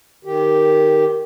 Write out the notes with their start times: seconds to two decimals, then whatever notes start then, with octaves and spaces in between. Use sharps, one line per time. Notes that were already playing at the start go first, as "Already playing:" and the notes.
0.25 D#3 G4